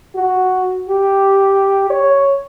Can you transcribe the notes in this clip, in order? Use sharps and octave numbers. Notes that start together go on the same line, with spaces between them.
F#4
G4
C#5